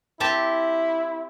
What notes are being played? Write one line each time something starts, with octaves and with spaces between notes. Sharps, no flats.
C4 E4 G4 A5